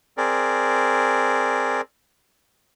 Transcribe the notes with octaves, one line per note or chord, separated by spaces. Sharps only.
C4 G#4 A#4 D5